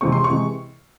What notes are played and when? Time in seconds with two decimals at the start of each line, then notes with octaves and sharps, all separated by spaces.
0.01 C3 E3 G#3 C4 C#6
0.12 C6
0.24 C#6
0.30 C3 E3 G#3 C4